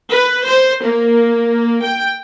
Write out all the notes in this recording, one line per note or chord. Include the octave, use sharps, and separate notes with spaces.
B4
C5
A#3
G5